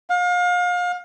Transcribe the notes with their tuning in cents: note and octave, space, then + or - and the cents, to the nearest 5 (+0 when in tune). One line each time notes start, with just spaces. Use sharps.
F5 +35